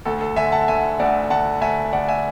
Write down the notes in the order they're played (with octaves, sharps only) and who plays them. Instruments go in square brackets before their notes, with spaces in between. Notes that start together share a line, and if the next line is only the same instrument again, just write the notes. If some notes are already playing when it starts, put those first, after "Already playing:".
[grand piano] D2 A4
A4
D3 E5 G#5
F#5 A5
D2 E5 G#5
D2 D5 F#5
D2 F#5 A5
D2 E5 G#5
D2 D5 F#5
E5 G#5